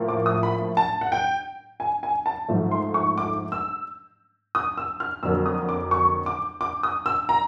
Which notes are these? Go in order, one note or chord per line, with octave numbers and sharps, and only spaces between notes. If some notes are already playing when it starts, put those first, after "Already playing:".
Already playing: A2 F3 A#3
D6
D#6
B5
A5
F#5
G5
G#5
G#5
A5
G#2 F3 A3
C6
C#6
D6
E6
D#6
E6
F6
F2 D3 F#3 A#3 E6
D#6
D6
C#6
D6
D6
D#6
E6
A#5